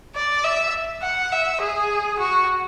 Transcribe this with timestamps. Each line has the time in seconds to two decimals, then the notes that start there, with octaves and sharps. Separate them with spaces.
0.16 D5
0.44 E5
1.03 F#5
1.32 E5
1.62 G#4
2.19 F#4